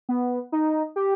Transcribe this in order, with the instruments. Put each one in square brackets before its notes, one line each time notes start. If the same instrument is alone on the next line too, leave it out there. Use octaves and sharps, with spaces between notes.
[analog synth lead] B3
D#4
G4